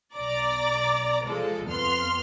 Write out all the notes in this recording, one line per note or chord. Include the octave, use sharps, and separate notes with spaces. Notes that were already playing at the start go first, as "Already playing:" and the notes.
B1 D5 A#5 D6
F3 G#3 A4
F2 B3 C6 F6